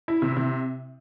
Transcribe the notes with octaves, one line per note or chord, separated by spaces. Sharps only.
E4
C3
C3